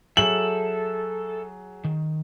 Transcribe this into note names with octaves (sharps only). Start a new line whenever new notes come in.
F#3 G#4 A4 E5 F#7
D#3